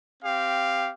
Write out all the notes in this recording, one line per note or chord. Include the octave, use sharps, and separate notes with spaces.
C4 G4 F5